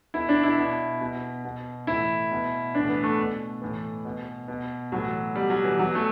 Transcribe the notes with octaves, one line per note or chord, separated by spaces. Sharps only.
B2 E4
D4
E4
B2
B2
B2
A2 E3 E4
B2
A2 E3 D4
B3
A3
B2
A2 E3
B2
B2
A2 E3 F#3
B2 G3
F#3
E3
B2 F#3
A3